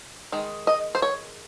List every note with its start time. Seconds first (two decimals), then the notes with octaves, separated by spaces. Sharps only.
0.32 D#3 G#3
0.67 D#5
0.95 C5
1.02 C#5